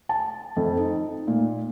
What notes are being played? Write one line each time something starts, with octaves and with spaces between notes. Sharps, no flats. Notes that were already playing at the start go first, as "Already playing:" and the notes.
A5
F2
D#4
A#2